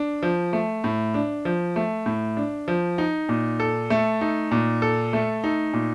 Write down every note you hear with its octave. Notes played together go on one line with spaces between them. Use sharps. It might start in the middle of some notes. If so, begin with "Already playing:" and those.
Already playing: D4
F3
A3
A2
D4
F3
A3
A2
D4
F3
D#4
A#2
A4
A3
D#4
A#2
A4
A3
D#4
A#2